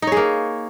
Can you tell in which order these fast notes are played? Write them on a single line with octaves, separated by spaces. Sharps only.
D#4 C#5 G#4 A#3